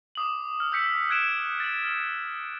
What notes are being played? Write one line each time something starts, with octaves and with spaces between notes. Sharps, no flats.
D6 D#6 F#7
F6
E6 G6 B6 C#7
E6 F#6 G#6 D7 E7
A6 F#7
F6